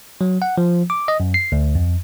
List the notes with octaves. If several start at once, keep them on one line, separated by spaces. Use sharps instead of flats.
F#3
F#5
F3
D6
D#5
F#2
C7
D2
F2